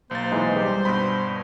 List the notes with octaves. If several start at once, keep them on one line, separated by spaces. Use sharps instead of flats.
B1 A#3 C5 A6
E3 G#3 D#4
G3 G4
G2 B2 B5